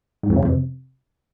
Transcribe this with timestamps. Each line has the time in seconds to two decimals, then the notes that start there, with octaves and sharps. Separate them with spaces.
0.23 G#2
0.30 F2
0.36 C#3
0.43 F2
0.49 C3